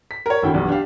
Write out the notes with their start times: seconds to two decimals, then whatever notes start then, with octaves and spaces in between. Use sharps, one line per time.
0.11 B6
0.26 A#4 C#5
0.43 G#1 D3 E4 F#4 G5
0.54 B1 G2 E3 D5
0.69 D4 G4 F5